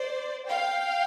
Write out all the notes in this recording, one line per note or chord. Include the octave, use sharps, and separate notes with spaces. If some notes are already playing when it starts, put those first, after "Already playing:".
Already playing: C5 D5
F5 G5